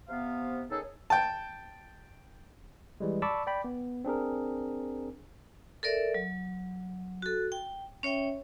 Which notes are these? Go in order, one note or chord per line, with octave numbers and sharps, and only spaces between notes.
C3 B3 F5
D#3 C#4 D#4 G#4 A4
G5 A5
E3 G3 G#3
D5 A5 B5 C#6 D6 E6
D5 G5 B5
B3
C4 D4 G#4 A#4
A4 A#4 D5 E5
F#3
F#4 A4
G5
C#4 C#5 E5 G5